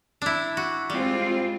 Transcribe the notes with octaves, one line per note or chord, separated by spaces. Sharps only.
D4 E4
F#4
G3 G#3 C4 F4